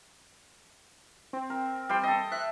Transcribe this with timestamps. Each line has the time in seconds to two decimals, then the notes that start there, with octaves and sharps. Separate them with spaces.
1.33 C4
1.50 A#4
1.89 G3 G5 C6
2.03 A4 D#5
2.32 E5 F#6